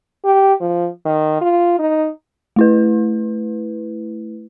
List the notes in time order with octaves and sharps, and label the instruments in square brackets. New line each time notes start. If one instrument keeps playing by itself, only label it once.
[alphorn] G4
F3
D#3
F4
D#4
[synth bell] A3 E4 B4